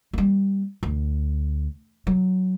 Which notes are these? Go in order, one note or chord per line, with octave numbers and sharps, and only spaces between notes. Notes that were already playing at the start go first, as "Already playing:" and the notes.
G3 A#3
D2
F#3